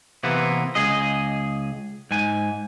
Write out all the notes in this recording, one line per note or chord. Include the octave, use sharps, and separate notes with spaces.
C3 E3 A#3 B3
C#2 G#4 D#5
G#2 G#5